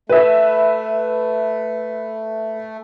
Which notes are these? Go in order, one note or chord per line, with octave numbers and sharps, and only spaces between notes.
A3 B4 E5